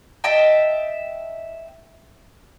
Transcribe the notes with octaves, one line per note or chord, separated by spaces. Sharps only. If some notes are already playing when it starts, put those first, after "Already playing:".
D#5 E5 G5 A5